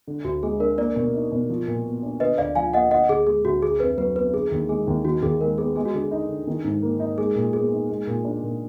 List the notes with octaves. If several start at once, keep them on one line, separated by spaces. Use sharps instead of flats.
D3
D2 F#4
G#3 G#4
D4 A#4
A#3 A#4 D5
B2
D#4
B2
F3
A#2
B3
D4
D3 B4 D#5
D2 D5 F5
F3 F5 G#5
A#3 D#5 F#5
D3 D#5 F#5
D2 G#4
G#3 G#4
D2 F#4
D3 G#4
F2 B4
F#3 B4
B3 B4
D3 G#4
D#2
G#3 G#4
D#2
D#3 F#4
D#2 G#4
G#3 A#4
B3 G#4
G#3 G#4
F#4
D3 G#4
D#4
D3
D#3
G#2
A#3
D#4
G#3 G#4
A#2
B3 G#4
D#4
G#3
A#2
D4
A#2